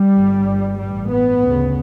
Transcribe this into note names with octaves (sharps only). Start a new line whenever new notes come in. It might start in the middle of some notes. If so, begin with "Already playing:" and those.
Already playing: G3
G1 G2
A1 G2 G3
B3
D2 C#3